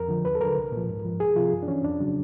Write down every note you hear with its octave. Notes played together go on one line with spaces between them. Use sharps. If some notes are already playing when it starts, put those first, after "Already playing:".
Already playing: F2 A#4
D3 F3
D#2 B4
A4
D3 F#3 A#4
C2
A#2
F3
G#2
F3
C2 G#4
C3 F3 F4
G2
D4
E3 C#4
F2 D4
C#3 F#3